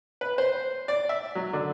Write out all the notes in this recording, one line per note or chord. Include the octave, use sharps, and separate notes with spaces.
B4
C5
D5
E5
F#3
D3